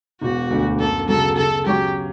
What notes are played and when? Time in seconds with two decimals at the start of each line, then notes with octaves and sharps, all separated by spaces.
0.21 E1 F#4
0.50 D2 D3
0.79 F#2 A4
1.08 C#3 F#3 A4
1.37 C#3 A4
1.66 F#3 C#4 F#4 G4